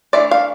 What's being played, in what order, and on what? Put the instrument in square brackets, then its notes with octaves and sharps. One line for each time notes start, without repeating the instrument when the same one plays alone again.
[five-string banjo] E3 A3 D4 D5
F5